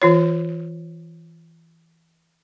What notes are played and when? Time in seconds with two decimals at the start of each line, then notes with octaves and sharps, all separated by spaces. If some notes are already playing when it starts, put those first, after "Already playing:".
0.02 E3 F4 C#5